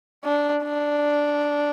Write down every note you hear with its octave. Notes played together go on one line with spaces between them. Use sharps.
D4
D4